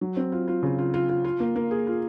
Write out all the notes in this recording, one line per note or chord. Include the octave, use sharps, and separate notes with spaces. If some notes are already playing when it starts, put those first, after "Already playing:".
F#3
C4
F4
F4
C#3
F4
F4
F4
F4
A#3
A#3
G#4
F4